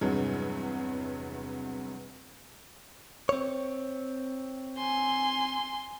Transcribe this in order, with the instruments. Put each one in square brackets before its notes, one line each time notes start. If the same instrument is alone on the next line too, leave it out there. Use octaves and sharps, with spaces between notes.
[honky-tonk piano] E2 G2 C3 F#3 G#3
[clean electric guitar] C4 C#5
[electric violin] G#5 C6